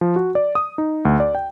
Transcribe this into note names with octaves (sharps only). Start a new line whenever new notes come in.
F3
F#4
D5
D#6
D#4
D2
D5
G5